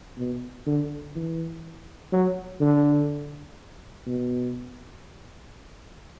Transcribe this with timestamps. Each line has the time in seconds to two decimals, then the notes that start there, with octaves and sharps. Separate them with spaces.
0.18 B2
0.67 D3
1.16 E3
2.12 F#3
2.61 D3
4.06 B2